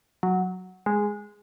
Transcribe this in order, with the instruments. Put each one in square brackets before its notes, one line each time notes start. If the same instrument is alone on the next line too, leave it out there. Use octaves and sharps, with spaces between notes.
[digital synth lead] F#3
G#3